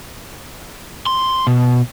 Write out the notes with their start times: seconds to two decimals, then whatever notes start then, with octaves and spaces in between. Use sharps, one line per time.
1.07 C6
1.47 B2